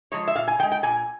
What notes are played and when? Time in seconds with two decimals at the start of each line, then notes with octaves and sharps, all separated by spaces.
0.12 F3 G#3 C#5
0.27 E5
0.36 A#2 F5
0.48 G#5
0.59 F3 G5
0.63 G#3
0.72 G5
0.83 A#2 G#5